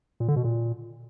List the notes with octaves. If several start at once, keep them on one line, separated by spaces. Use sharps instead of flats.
A#2
D3
B2
A#2